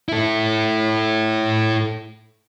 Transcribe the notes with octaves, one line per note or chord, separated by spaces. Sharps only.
E4 A4